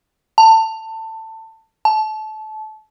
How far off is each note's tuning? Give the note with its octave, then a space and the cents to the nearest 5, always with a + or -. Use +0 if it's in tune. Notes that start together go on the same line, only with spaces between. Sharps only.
A5 +20
A5 -25